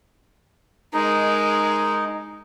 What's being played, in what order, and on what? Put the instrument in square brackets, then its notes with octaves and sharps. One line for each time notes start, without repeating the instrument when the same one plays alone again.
[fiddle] G#3 A#4 [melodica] D#4